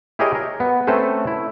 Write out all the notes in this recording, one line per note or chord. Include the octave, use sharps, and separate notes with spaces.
E4 G4 G#4 A#4 C#5 D#5
A#4
B3
A3 C4 C#4 A4 B4 C5
E4